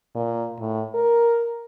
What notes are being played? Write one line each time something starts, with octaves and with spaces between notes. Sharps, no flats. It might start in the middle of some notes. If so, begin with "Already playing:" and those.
A#2
A2
A#4